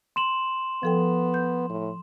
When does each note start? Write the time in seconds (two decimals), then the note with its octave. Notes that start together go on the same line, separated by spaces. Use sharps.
0.16 C6 E7 F#7
0.83 F3 B3 A4 G5
1.34 G6
1.70 A2